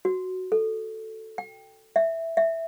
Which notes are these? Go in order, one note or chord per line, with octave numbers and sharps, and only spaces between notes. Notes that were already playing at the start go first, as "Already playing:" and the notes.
F#4
A4
G5
E5
E5